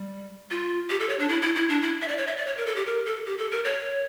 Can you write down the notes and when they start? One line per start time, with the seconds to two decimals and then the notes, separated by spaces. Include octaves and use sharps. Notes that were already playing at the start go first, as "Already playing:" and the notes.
Already playing: G3
0.51 F4
0.90 G4
1.00 A4
1.09 C#5
1.19 D4
1.29 E4
1.42 E4
1.55 E4
1.69 D4
1.82 E4
2.02 E5
2.08 D5
2.18 C#5
2.27 E5
2.37 D5
2.47 C#5
2.57 A#4
2.66 A4
2.76 G4
2.86 A#4
3.06 A4
3.26 G4
3.38 A4
3.51 A#4
3.64 C#5